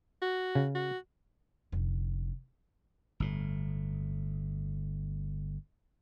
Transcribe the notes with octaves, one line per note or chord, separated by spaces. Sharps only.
F#4
C#3
F#4
F1 D3
G1 A2